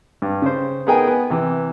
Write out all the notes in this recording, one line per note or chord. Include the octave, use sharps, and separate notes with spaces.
G2
C#3 C5
B3 D#4 G#4 A#4 G5 G#5
B3
C3 E3